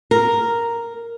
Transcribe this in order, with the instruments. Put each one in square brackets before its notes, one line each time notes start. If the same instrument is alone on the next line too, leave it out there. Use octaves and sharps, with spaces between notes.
[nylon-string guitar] A#4